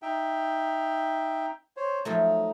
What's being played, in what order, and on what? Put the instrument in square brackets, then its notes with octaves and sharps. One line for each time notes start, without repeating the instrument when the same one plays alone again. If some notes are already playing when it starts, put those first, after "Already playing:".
[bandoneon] D#4 E5 G5
C5 C#5
[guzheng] F3 F#3 A3 [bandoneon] D#4